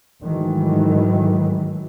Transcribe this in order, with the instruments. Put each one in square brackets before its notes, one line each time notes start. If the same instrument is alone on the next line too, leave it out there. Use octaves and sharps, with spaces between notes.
[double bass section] G#2 D#3 E3 F#3 A3